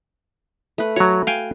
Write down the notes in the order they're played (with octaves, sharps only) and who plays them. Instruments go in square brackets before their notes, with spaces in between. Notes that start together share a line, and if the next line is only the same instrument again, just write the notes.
[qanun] A3 B4
[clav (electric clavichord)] F#3 C#5 [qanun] F#4
[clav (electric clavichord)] F5 G5 G#5